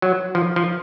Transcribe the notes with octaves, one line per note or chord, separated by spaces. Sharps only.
F#3
F3
F3